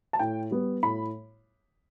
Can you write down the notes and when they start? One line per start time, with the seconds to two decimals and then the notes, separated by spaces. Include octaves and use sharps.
0.13 A5
0.19 A2 G5
0.51 G3 B3
0.83 A2 B5